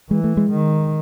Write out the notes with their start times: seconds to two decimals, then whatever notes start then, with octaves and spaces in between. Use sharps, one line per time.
0.10 E3 G#3
0.24 A3
0.37 G#3
0.50 D#3